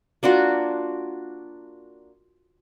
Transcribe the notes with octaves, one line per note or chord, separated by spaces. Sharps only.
A#3 D4 F4 F#4